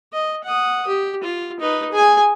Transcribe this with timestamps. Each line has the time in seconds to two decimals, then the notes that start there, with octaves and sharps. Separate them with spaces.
0.13 D#5
0.44 F#5 D#6
0.87 G4
1.23 F4
1.60 D#4 B4
1.92 G#4 G#5